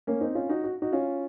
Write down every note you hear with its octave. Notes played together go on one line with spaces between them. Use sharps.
A#3 C#4
C4 D#4
C#4 F4
D#4 F#4
F#4
D#4 F#4
C#4 F4